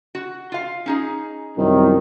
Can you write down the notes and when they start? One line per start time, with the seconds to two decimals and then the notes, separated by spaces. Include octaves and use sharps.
0.15 F#4
0.52 F4 F5
0.86 C#4 D#4 G#4
1.57 C2 F#2 D#3